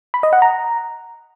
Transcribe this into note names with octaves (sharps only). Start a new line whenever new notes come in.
B5
D#5
F#5
A#5